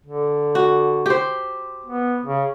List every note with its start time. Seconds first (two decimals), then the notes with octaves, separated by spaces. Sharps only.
0.06 D3
0.55 F#4
1.06 G4 C5
1.86 B3
2.25 C#3